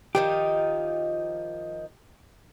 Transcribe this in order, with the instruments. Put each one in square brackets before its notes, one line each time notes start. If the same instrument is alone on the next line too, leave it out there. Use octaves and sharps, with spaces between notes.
[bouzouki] D#3 F3 D#4 [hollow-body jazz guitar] G4